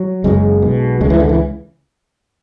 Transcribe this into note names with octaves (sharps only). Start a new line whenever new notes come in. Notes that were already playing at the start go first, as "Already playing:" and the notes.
Already playing: F#3
F#1 F#2 C#3 G#3
B1 B2
C#2 C#3 G#3
E3
D3
E3